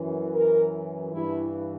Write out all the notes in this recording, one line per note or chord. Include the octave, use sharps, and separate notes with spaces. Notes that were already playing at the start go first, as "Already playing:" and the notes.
Already playing: F#2 E3
A#4
G2 E3 E4